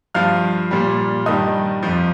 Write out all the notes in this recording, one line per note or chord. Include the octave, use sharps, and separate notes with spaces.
G2 F3 F5 F6
A#2 G3
G2 D#3 G3 D#5 D#6
F2 F3